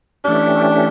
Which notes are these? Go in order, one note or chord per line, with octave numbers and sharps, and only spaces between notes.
E3 A3 C#4 D4 G4